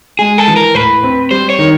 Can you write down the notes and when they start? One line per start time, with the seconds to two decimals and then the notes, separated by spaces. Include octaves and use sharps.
0.19 G#3 G#4
0.38 A4
0.48 E3
0.56 A#4
0.75 A2 B4
1.03 C4
1.31 G3 C5
1.50 C#5
1.59 D#3